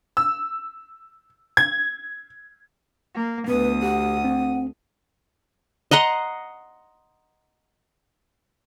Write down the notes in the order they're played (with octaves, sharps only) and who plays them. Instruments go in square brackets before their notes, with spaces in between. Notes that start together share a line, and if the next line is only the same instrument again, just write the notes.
[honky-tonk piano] E6
G#6
[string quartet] A#3
[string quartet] D2 D#6 [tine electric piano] B3 [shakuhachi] B4
[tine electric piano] G4 [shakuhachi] F#5
[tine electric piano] C4
[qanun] D#5 F#5 A#5 C6